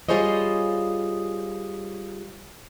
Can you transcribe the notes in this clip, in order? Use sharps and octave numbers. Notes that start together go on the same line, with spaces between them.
G3 F4 G#4 C5 C#5 D#5